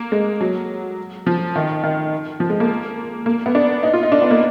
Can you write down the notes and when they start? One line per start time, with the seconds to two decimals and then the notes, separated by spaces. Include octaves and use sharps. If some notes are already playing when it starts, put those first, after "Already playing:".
Already playing: A#3
0.12 G#3
0.41 F#3
1.27 F3
1.56 D#3
1.84 D#3
2.40 F3
2.50 G#3
2.60 A#3
3.26 A#3
3.46 B3
3.55 D4
3.83 D#4
3.93 F4
4.03 D#4
4.12 D4
4.22 B3
4.31 A#3